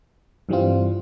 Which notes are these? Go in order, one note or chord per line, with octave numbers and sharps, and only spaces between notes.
G2 E3 G3 C4 F4